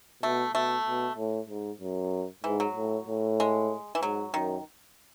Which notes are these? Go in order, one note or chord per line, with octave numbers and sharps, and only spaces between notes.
B2 A3
B2 A3
B2
A2
G#2
F#2
G#2 E3
F#3
A2
A2
G#3
E3
G#2 F#3
F#2 D#3